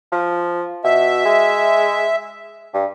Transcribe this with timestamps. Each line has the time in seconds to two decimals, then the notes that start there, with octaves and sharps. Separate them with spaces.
0.12 F3
0.84 B2 E5
1.25 G#3
2.74 G2